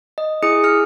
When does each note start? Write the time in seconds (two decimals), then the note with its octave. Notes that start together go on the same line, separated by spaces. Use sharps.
0.18 D#5
0.43 E4 G#4 D#6 C#7
0.64 G#4 F6 C#7